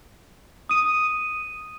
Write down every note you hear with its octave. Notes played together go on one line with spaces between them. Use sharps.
D#6 D#7